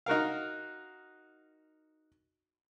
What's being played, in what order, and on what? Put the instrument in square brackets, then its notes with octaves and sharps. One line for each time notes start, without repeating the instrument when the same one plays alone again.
[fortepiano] D#4 F#4 A#4 F5